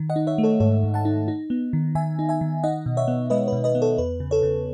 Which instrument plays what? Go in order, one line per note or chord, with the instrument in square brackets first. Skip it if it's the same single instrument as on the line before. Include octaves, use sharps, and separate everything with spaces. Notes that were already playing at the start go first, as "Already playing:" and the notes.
Already playing: [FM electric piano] D#3
D#5 F#5
D#4
C#5 E5
A3
A4 C#5
G#2 A4 C#5
G#2
F#5 A5
D#4
D#4
B3
D#3
D#3 E5 G#5
D#4
E5 G#5
D#3
D#4 D#5 F#5
B2
C#5 E5
B3
G#3 B4 D#5
B4
B2
B4 D#5
B3
A4 C#5
E2 B4
C#3
A4 C#5
C#3